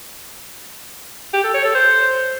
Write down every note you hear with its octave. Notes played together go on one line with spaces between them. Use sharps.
G4
A4
C#5
A4
C5